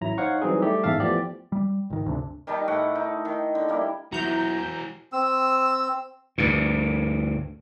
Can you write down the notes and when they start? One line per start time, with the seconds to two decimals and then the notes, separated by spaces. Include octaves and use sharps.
0.01 A1 F#3 E4 A#5
0.18 D#4 C5 C#5 F5 F#5 C#6
0.42 E3 F#3 G3 C4 D#4 G#4
0.62 G3 A3 G4
0.83 A1 E2 G#2 E5 F5 A5
1.00 E3 F3 A3 B3 G4 D5
1.52 G3
1.90 G#1 D#3
2.05 G1 D2 C3 D4
2.47 D#3 G3 D#4 A5
2.68 A2 F#5 C#6 D6
2.95 D#4
3.25 D#3
3.55 D3
3.68 G3 A#3 E4
4.12 E2 A#2 E3 F#3 E4 F#4 A#5 G6
5.13 C4 E6
6.38 D2 G2 A#2